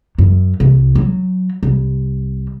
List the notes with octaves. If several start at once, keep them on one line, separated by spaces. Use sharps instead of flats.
F#2
C2
F#3
C2